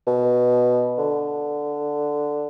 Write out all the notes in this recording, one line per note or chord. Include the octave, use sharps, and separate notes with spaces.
B2
D3